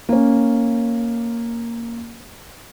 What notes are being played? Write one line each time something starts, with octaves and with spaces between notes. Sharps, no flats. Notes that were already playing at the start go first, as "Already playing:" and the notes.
A#3 C#4